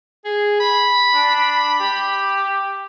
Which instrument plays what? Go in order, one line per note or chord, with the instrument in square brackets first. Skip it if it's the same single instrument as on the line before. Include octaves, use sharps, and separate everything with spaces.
[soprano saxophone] G#4
B5
[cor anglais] D4
G4